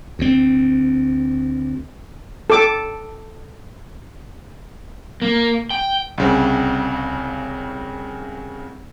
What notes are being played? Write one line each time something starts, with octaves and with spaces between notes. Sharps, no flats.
D2 C4
A4 D6
A#3
G5
C2 C#3 C4